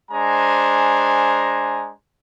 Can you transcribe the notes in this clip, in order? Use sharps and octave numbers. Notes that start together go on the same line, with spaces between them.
G#3 D4 C5 G#5 A#5